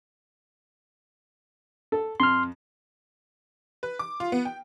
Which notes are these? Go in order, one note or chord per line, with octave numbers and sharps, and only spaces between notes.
A4
F2 C6 F6
B4
D6
F4
B3
G5